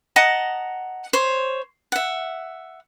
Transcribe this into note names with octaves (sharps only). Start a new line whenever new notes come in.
D#5 F#5 A5 A#5
C5 C#5
E5 F#5